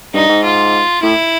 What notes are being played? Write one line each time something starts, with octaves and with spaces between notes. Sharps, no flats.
G2 D#4
G#2
F4
A2 E4